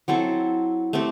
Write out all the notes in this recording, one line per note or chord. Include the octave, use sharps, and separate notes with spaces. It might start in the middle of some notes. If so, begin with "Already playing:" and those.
F#3 C4 E4 A4
A3 C4 G4